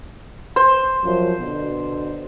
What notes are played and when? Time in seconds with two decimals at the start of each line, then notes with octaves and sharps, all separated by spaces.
0.56 C5
1.04 F#2 F3
1.39 B2 D3